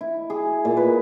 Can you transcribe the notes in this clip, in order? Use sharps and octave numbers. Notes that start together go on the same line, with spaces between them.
E4
G#4
A#2
B4